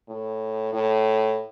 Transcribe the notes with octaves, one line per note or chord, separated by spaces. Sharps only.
A2
A2